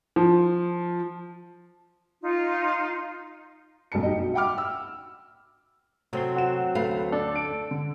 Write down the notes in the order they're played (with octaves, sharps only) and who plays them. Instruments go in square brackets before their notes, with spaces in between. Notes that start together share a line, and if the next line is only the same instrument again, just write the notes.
[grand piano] F3
[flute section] D#4 F4
[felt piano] F#1 B1 G2 A5 C#7
D#4 G4 D#5
B2
E5 F#5 G5 B5 D6 F6
E6
[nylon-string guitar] C3 A3 [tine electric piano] F#3 C4 C6
[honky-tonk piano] F#4 E7
[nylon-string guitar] D2 A3 F5 [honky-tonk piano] B4
[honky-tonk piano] D4 [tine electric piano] A4
[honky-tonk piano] D7
D3